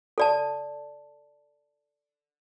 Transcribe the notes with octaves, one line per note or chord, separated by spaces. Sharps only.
A4 D5 A5